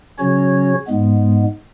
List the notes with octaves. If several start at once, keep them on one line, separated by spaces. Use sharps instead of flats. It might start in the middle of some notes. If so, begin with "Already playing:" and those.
C#3 F#3 C#4 F#4 C#5
G#2 G#3 B3